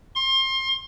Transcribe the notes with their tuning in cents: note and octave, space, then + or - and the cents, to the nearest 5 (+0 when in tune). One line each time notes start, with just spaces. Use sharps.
C6 +30